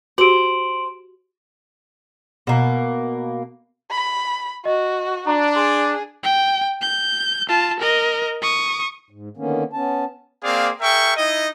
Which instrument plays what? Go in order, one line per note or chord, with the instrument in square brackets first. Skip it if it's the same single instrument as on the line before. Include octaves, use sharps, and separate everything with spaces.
[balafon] F#4 G4 [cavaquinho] C5 [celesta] D7 F#7
[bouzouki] B2 A#3
[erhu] B5
[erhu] F#4 [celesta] D#5
[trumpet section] D4 [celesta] A#5
[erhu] G#4 [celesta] C6
[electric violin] G5
G6
F4 A5
A#4 D#5
C#6 D#6
[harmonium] G#2
D3 D#3 A#3 B3 C#4
B3 C#4 A5
[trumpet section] A#3 C4 G#4 D5 F5
G#4 A#4 E5 G5 C#6
D#4 E4 D#5